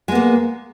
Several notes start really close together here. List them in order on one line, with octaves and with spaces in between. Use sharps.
G#3 B3 A#3